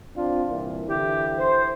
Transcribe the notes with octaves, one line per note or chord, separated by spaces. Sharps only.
C4 D4 F4
C2 A#2 E3
D3 E3 E4 G4
C5